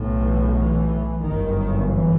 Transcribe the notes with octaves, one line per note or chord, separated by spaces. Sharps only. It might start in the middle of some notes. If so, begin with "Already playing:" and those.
Already playing: B1 A2
E3
E3
G1 F#2 D#3
E3